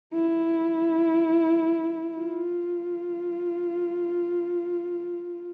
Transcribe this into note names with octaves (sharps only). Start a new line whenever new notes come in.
E4
F4